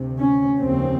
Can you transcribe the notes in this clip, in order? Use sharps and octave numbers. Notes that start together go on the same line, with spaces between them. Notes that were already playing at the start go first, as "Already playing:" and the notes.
Already playing: D2 C3
C#4
F1 D#2 C#3 C4